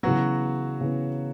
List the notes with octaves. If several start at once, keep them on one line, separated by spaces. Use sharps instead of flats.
C#3 E3 F#3 B3 F#4
C#3 E3 B3